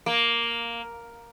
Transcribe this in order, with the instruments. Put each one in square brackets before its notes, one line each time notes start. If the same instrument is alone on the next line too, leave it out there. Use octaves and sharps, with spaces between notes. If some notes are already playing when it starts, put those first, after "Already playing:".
[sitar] A#3